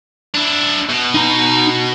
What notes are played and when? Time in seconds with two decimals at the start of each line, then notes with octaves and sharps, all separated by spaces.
0.34 D4 E4
0.89 B2
1.15 D#4 A#5